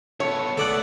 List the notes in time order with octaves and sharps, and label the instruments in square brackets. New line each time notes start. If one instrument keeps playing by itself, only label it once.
[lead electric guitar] B3 A4 [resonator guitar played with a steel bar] C#5
[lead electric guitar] D2 B3 [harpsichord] A4 D5 F#5